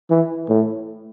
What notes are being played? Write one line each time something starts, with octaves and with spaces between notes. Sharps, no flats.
E3
A2